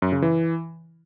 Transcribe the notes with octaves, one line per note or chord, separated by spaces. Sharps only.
F#2
C#3
E3